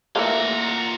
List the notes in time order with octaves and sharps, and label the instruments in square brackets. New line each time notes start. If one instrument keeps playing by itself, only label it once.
[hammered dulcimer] A#2 [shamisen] E3 A3 A#3 [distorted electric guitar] F4 F#5 [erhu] A#5